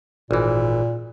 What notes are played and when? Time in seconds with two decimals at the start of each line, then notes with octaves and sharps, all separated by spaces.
0.31 G#1 A#2 E3